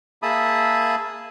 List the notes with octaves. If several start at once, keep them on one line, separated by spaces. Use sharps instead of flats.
A#3 G#4 E5 A5 B5 D#6